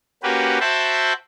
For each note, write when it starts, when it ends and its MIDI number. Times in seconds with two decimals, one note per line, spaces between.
0.23 0.59 58
0.23 0.59 61
0.23 0.59 66
0.23 0.59 67
0.23 0.59 71
0.60 1.13 66
0.60 1.13 72
0.60 1.13 76
0.60 1.13 79
0.60 1.13 81
0.60 1.13 83